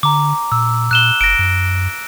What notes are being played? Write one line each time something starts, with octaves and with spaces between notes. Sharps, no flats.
D3 A#5 D6
A#2 E6
A#2 F#6 E7 G7
F#1 A#6 D7
F#2